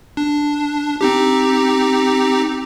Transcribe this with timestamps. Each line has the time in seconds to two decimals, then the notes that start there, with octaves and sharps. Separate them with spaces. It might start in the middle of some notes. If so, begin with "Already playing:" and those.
0.17 D4
1.01 C4 D#4 G4